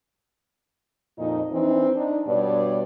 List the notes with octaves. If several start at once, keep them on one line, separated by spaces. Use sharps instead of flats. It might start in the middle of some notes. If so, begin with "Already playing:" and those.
F2 A#2 D#4
E3 C4 D4 D#4
D4 D#4
G2 B2 B3 C#5 D5